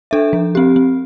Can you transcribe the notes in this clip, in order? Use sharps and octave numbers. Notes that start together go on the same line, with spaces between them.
D4 A4 E5
F3
C4 G4
C4